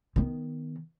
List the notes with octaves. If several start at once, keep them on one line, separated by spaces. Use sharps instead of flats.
D#3 B3